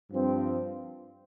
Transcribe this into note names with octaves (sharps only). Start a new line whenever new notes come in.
G2 F3 C4